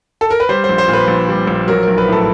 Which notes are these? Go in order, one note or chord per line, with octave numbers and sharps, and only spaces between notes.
A4
A#4
B4
G3 C5
C5
A#1
C5
A#2
B4
A#1
G3
A#1
F#3 A#4
B1 A#4
B4
A2 A4